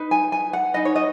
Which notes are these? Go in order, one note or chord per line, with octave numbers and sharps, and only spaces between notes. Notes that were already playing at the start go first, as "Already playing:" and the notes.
Already playing: D#4 B4
G#5
G#5
F#5
D#4 B4 D#5
C#5
D#5